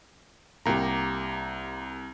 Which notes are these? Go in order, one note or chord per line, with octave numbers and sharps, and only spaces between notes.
C2 A#3 G4 A#5